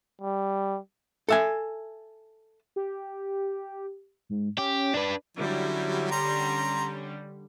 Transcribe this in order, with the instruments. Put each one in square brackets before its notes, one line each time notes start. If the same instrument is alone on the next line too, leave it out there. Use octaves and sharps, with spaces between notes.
[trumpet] G3
[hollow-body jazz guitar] A4 E5 G#5
[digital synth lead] G4
G#2
[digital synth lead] C#4 [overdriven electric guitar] G4
[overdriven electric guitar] D4 B4 [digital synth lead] D5
[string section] D3 G3 C#4 [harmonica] F#3 E4
[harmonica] A#5 C6